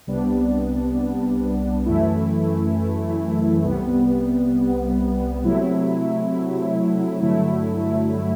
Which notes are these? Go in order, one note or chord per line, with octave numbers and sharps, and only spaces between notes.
C2 C3 G3 B3 D4
F#2 E3 A3 E4
C2 C3 G3 B3
C3 F#3 A3 E4
G2 D3 F#3 A3 E4